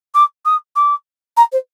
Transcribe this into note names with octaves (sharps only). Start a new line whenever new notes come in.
D6
D#6
D6
A#5
C5